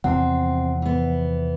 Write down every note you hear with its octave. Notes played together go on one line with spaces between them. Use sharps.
E2 C3 F3 C4 F#5
E3 B3